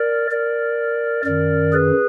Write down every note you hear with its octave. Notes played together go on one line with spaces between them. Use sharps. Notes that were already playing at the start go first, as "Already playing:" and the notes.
Already playing: A#4 D5
A#4 D5
F#2 D#3 A#4 D5
G#4 B4